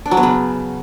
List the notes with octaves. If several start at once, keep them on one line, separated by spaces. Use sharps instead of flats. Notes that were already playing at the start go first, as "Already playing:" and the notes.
D4
F#3
B3
C#3